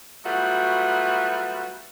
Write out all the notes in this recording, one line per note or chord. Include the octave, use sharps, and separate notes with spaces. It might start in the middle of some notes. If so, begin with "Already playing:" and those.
F#3 G3 A3 B3 F4 F#4